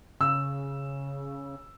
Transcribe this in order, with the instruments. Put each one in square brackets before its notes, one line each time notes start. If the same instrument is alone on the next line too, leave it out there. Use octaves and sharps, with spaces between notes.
[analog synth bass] C#3 [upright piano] E6